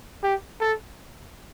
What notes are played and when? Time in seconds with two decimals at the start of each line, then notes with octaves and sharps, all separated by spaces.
0.23 G4
0.60 A4